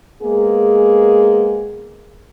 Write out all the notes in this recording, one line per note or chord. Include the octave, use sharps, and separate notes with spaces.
G#3 A#3 B3 G#4